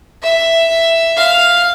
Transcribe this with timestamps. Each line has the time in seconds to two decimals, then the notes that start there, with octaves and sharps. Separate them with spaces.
0.23 E5
1.17 F5